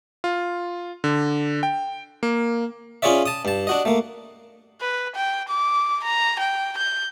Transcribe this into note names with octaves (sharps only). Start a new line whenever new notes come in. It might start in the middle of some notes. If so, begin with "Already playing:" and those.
F4
D3
G5
A#3
C#4 F4 G#4 C#5 D5 E5
A5 D#6
G2 A5
D4 F#4 D#5
A3 A#3
B4
G5
D6
A#5
G5
G6